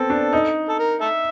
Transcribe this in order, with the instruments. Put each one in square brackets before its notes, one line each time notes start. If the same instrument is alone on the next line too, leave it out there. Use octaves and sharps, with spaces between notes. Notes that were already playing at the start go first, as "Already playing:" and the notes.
Already playing: [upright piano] B3 C4 [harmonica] A4
[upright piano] D4
D#4
[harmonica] A4
A#4
A4 E5